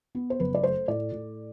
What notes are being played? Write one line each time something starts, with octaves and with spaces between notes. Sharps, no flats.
B3
C5
F#1 B4
D5
A3 C5
A2 D5
A2